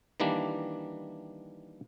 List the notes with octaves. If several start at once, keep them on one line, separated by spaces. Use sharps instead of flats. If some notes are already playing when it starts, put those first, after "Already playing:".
D#3 E3 G3 A#3 D4